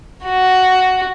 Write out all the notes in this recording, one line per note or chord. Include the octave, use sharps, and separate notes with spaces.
F#4